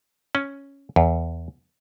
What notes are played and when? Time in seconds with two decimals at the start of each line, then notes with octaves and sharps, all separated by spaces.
0.35 C#4
0.96 E2